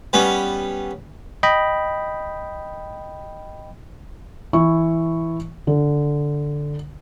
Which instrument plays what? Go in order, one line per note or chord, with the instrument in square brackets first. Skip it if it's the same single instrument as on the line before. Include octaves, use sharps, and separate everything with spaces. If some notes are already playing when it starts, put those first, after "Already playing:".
[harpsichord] G3 B3 C#4
[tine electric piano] D#5 G5 B5
[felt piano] E3 E4 C#6
D3